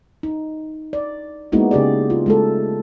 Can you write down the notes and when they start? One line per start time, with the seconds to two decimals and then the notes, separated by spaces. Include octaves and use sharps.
0.23 D#4
0.93 D5
1.52 G#3 A#3 B3 D#4 E4 F#4
1.71 C#3 G4 G#4 D5
2.10 F4
2.26 G#3 A3 A4